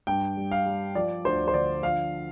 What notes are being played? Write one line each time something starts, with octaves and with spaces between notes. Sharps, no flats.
G2 G5
G3
F5
G3
F3 D5
D2 C5
C5
D3 D5
F3 F5